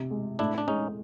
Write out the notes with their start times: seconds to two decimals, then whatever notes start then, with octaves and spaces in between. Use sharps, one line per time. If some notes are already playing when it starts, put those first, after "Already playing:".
Already playing: C3
0.11 G#3
0.39 A2 D4 E4
0.58 D4
0.68 G#3 C#4 D#4